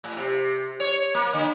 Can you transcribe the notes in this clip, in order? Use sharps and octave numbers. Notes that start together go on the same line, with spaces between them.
A2
C3
C#5
A#3
D3